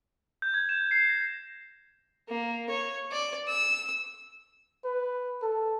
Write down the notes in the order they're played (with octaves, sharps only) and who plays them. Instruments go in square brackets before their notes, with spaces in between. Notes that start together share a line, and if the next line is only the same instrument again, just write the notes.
[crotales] G6
G#6
E7
C7
A#6
[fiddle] A#3
C#5
D5
E6
[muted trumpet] B4
A4